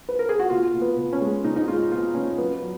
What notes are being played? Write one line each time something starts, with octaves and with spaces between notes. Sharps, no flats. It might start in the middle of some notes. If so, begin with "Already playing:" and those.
B4
A#4
G#4
F#4
B2 F4
B2
B3
B2
C#4
G#3
B2 D#4
D#4
G#3 F4
B2 F4
B2 C#4
F#3 B3
F#3